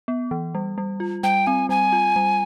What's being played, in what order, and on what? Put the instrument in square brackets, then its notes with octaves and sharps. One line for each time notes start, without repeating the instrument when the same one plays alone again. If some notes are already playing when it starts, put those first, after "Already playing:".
[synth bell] B3
E3
G3
G3
F4
[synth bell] G3 [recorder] G5
[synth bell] C4 [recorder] G#5
[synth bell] G3 [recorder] G#5
[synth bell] F4
G3